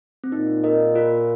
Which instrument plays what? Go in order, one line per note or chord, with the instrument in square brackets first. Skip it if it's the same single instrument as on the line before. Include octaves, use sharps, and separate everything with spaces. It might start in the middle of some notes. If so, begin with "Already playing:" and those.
[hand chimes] C4
[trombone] A#2 [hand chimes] D#4
[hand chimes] A#4 D#5
F4 A#4